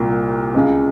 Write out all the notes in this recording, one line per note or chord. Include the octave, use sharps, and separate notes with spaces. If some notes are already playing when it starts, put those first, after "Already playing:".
Already playing: C2 A#2
C#2 C#3